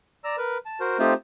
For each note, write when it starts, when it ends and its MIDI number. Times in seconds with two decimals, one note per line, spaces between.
0.24 0.36 74
0.24 0.36 82
0.24 0.36 88
0.38 0.58 70
0.38 0.58 71
0.66 0.79 81
0.80 0.98 66
0.80 0.98 70
0.80 0.98 72
0.99 1.14 57
0.99 1.14 60
0.99 1.14 63
0.99 1.14 65
0.99 1.14 67
0.99 1.14 72